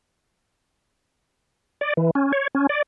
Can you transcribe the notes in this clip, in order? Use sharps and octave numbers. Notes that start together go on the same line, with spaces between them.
D5
E3
C#4
C#5
C#4
D5